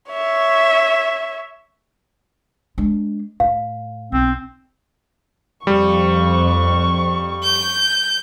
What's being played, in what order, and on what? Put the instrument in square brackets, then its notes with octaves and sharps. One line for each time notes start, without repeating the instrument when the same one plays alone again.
[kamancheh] C#5 E5
[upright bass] G#3 D4
[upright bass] A2 [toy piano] F5
[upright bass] B1 [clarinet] C4
[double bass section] F2 [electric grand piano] G3 [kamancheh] C#6
[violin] G6